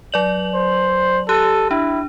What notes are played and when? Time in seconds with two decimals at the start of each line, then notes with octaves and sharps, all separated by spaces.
0.12 F#3 D5 F#7
0.55 C5
1.29 G4 A4 F#6 D#7
1.71 D4 E4